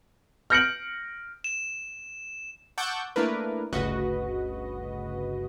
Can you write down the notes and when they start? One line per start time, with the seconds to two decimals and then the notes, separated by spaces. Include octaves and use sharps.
0.50 F6 G6 A#6 C#7 D7 F#7
1.44 E7
2.78 F#5 A5 C#6 D6 E6 G6
3.16 A3 A#3 D4 E4 A#4 B4
3.73 G1 D2 C#3 F#4 B4 D#5